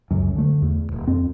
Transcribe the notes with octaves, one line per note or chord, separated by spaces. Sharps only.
D#1 C#2 F#2
D3 A3
E2
D#1
F2 C4